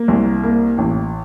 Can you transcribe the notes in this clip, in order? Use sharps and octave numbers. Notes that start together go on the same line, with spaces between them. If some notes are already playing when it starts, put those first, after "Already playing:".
Already playing: A#3
C2
A#3
A1